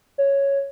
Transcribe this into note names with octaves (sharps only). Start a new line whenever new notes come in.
C#5